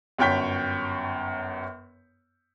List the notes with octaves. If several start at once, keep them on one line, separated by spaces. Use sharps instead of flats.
G1 F#2 C#5 G5 G6 B6